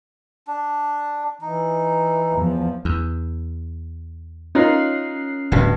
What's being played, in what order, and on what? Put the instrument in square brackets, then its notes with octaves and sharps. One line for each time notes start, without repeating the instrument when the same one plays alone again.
[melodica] D4
[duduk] E3 [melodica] D#4
[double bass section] E2 F3
[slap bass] E2
[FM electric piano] C#4 F#6 C7 [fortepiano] D#4 F4 A#4
[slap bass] D1 B2 [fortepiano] G2